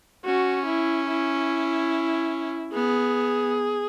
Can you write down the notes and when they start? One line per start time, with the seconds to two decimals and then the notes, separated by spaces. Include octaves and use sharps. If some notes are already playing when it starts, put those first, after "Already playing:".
0.25 C#4 F#4
0.66 E4
1.08 E4
2.73 B3 G#4